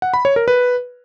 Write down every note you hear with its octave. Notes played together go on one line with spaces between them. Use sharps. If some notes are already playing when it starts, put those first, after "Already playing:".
F#5
B5
C#5
A#4
B4